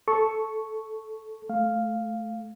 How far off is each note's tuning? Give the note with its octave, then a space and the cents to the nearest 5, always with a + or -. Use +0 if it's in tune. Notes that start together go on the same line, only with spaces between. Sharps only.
A4 -5 C#6 +0
A3 -15 F5 +0